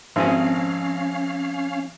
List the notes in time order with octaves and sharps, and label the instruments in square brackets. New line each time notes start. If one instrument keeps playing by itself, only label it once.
[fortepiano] G#1 [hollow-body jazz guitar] F3 C4 G#5 [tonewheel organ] C#4 F5